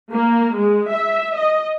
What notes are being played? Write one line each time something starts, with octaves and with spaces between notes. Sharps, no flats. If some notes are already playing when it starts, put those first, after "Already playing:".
A#3
G#3
E5
D#5